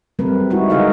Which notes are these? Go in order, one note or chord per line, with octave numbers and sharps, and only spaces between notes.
F#3 G3 A3 C4 A#4 B4
G#3 D#4 E4 F#4
D3 G#3 G#4 A#4 D#5 F5